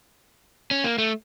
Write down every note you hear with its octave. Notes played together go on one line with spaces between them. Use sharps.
C#4
A#3
A3